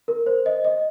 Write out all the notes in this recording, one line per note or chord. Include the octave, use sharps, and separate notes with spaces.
A#4
C5
D#5
D#5